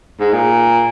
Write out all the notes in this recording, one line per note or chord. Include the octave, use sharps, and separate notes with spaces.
G#2
A#2